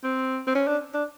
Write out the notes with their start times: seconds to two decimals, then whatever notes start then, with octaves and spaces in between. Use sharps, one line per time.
0.04 C4
0.47 C4
0.55 C#4
0.68 D4
0.94 D4